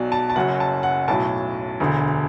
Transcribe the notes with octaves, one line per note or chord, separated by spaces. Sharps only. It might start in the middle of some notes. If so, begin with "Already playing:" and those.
Already playing: B1 B2 F#3 D5
A5
A5
F#1 F#2 F#3 F#5
A5
F#5
B1 A2 F#3 A5
E1 D2 D3